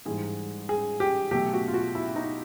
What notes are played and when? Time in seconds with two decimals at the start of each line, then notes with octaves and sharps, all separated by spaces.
0.05 G#2 E3 G3 G#4
0.69 G#4
1.00 G4
1.31 B2 F#3 A3 G4
1.53 F#4
1.68 F4
1.73 F#4
1.95 E4
2.16 D#4